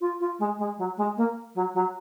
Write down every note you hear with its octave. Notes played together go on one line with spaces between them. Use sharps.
F4
F4
G#3
G#3
F#3
G#3
A#3
F#3
F#3